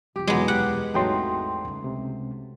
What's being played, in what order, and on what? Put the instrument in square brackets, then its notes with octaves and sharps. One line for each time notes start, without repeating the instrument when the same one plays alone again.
[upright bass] F1 F3 [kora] G4
[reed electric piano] E2 B2 F#3 [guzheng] G#3 B3
[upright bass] D2 [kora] G4 G5 [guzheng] F#5
[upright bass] G#1 E4 [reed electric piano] E2 G5 C6 [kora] F#3 A3 D#4
[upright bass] C#2 G#3
[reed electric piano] C3